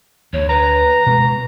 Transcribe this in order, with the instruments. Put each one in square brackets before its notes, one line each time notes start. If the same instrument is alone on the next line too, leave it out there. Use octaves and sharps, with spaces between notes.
[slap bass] D2 [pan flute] C#5
[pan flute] B4 [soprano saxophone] A#5
[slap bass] B2 G#3